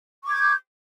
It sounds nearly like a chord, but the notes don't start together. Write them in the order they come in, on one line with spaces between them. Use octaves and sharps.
C#6 D6 G#6 G6